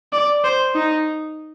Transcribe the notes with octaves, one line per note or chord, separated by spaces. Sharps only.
D5
C5
D#4